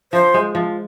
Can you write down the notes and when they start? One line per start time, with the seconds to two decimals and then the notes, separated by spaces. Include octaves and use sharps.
0.13 F3 C5
0.34 G#3
0.55 F3